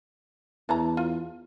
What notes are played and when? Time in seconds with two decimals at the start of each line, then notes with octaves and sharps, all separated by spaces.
0.69 E2 E3 A5 A#5
0.97 F4